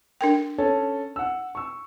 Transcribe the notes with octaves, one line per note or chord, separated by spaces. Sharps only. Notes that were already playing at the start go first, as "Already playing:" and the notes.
D4 A#4 G5
C#4 A4
F#5 E6
C#6 E6